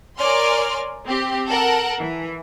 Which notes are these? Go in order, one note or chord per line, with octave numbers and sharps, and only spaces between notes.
A#4 C#5 D5 G#5 C6 F6
C4 G4
A4 A#4 F#5
E3